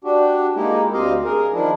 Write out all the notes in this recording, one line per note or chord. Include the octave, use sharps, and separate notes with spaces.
D4 F#4 G4
G#3 A#3 D#4 E4 G4
D2 C4 G4 D#5 F5
G#4 A#4
D#3 F3 D4 E4